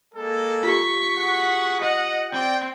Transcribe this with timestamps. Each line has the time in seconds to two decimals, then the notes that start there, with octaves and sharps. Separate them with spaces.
0.14 G#3 A#3 A4
0.63 F4 G4 C#6 B6
1.16 F#4 G#4 F#5
1.81 D#5 F#5
2.31 C4 D5 G5